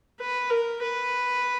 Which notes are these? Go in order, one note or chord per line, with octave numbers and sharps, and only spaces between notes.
B4
A#4
B4